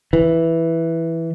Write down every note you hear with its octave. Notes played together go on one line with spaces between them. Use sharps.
E3